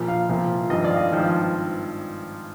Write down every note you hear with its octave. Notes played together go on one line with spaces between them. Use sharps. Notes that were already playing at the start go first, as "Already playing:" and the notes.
Already playing: A#1 A#2 F3
F5
C2 A#2 F3
G#1 G2 F3 D#5
D5
F5
D#5
G#1 G2 F3